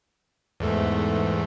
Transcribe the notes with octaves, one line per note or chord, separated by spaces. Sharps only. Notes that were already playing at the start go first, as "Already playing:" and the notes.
E2 G#2 A3